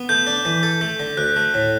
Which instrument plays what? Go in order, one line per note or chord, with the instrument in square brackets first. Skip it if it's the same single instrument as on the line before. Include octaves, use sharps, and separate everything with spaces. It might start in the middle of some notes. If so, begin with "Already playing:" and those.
Already playing: [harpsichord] B3
[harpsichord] A3 [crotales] G6
[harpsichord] D4
E3
A4
A3
D3
[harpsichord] D2 [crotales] F#6
[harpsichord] A3
A2